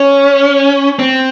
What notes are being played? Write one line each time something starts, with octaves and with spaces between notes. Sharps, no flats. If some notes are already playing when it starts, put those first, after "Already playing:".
Already playing: C#4
C4